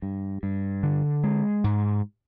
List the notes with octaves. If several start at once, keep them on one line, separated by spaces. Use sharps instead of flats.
G2
G2
D3
G#3
G#2